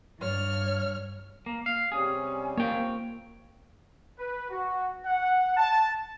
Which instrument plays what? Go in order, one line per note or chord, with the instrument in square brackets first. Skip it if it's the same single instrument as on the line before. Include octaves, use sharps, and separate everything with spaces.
[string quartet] G2 C#5 F6
[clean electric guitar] A#3
F5
[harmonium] C3 G3 C#4 [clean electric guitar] G#4
[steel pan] A#3 [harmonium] C4 [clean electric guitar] C#5 G5
[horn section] B4
F#4
F#5
A5